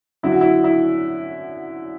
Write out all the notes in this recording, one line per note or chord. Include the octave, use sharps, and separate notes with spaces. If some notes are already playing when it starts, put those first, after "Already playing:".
F#2 D3 F#3 E4
F#4
E4
E4